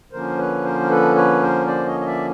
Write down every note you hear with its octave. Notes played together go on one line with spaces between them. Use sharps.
D3 F3 A#3 C#4 A#4 C5
B4 C#5
A#4 C5
A#4
A4 B4
B4 C#5
A#4 C5
C5 D5
C#5 D#5
D#5
D5 E5